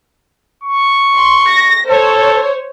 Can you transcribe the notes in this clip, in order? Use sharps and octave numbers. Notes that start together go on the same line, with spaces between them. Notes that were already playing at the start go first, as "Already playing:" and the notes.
C#6
C6
A#6
A4 C5 C#5